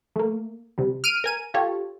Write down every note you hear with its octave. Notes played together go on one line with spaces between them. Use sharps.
A3 A#3
C3 G3
F6 D7 D#7
A#4 G#5 D#7
F4 G4 A4 C#5